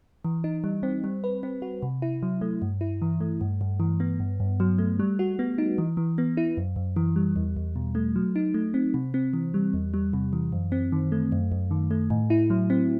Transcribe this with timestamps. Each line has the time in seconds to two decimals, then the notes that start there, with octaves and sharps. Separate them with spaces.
0.25 E3
0.44 D#4
0.64 G3
0.83 C4
1.04 G3
1.24 B4
1.43 C4
1.62 F#4
1.82 C3
2.02 E4
2.23 F#3
2.41 A3
2.62 G2
2.81 E4
3.02 E3
3.21 A3
3.41 G2
3.61 G2
3.80 E3
4.00 B3
4.20 G2
4.40 G2
4.60 F#3
4.78 A3
4.99 G3
5.19 F#4
5.39 B3
5.58 D#4
5.78 E3
5.97 E3
6.18 B3
6.37 E4
6.57 F#2
6.76 F#2
6.96 E3
7.16 G3
7.36 E2
7.57 E2
7.76 B2
7.95 A3
8.16 F#3
8.36 D#4
8.54 A3
8.74 C4
8.94 C3
9.14 C4
9.33 E3
9.54 G3
9.74 E2
9.94 G3
10.13 C3
10.33 E3
10.52 F#2
10.72 C4
10.92 D#3
11.12 A3
11.32 F#2
11.52 F#2
11.71 D#3
11.91 A3
12.10 A2
12.30 E4
12.50 F#3
12.70 C4